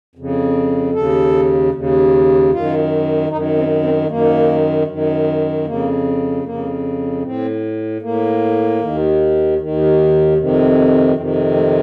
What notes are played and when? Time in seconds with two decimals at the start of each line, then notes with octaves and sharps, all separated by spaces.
0.15 F2 C#3
0.93 D#2 C#3 A4
1.73 D#2 C#3
2.51 F#2 D#3 F4
3.29 F#2 D#3 D#4
3.56 C4
3.82 C4
4.08 F#2 D#3 A#3
4.87 F#2 D#3
5.65 F2 C#3 A#3
6.44 F2 C#3 A#3
7.23 A2 C4
8.02 A2 A#3
8.81 D#2 D#3
9.59 D#2 D#3
10.38 F2 C3 D#3
11.16 F2 C3 D#3 C4
11.35 C4
11.56 A3